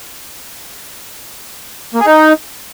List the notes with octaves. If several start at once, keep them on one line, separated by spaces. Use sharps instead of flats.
A#3
G#4
D#4